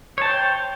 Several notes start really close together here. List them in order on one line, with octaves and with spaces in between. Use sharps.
C#5 A5 C5 G5